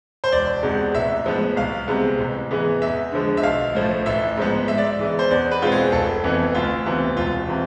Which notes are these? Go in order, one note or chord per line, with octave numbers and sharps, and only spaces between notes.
C5
E1 D5
E2 C3 G#3 B3
A1 E5
A2 F3 G#3 B3
C2 F5
C3 G#3 B3
A1
G#2 E3 G#3 B3
E2 E5
D3 F3 G#3
E5
B1 F5
A2 F3 A3
A1 E5
G#2 F3 B3
G#2 E5
D5
E5
E3 G#3 B3
C5
E2 D5
B4
B2 G#3 C4 F4
G#4
F1 A4
F2 E3 B3
D2 F4
C3 E3 B3
E1 F4
C3 E3